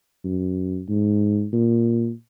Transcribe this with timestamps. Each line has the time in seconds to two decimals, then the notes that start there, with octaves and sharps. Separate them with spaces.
0.24 F#2
0.88 G#2
1.53 A#2